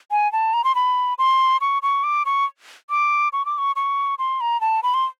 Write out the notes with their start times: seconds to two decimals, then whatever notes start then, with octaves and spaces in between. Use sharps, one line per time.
0.11 G#5
0.32 A5
0.53 A#5
0.64 C6
0.75 B5
1.18 C6
1.61 C#6
1.83 C#6
2.04 D6
2.26 C#6
2.90 D6
3.33 C#6
3.46 D6
3.58 C#6
3.76 C#6
4.19 C6
4.41 A#5
4.61 A5
4.83 B5
4.94 C6